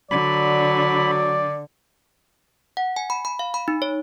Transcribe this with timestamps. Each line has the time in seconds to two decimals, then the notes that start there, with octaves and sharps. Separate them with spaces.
0.11 D3 F#3 D5 B5
2.77 F#5
2.96 G#5
3.10 B5
3.25 B5
3.39 F5
3.54 B5
3.68 D#4
3.82 C#5